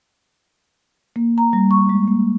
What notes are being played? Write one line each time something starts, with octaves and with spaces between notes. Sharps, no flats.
A#3
A#5
G3
C#6
G#3
A#3